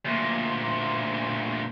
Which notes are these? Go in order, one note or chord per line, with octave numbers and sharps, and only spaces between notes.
D2 A#2